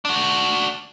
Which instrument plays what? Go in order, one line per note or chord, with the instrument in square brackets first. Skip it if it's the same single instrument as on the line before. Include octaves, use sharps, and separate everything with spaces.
[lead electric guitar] D4 F#4